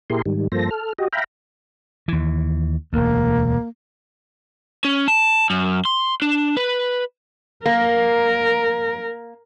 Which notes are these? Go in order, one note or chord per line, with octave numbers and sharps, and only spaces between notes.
A#2 E4 G4 G#4 A#4 C6
G#2 D#3 G3
G2 F3 A#3 A4 C5 A#6
A4 F6
F#4 G4 D#5
E5 F5 G5 A#5 B5
D#2 E3
E1 D2 A#3
C#4
A5
F#2
C6
D4
B4
A#3 A#4